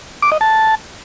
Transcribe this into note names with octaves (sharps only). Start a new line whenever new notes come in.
D6
D#5
A5